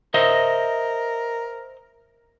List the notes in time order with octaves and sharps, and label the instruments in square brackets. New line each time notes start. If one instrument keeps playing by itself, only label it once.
[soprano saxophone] A#4 [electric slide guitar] C5 D#5 E5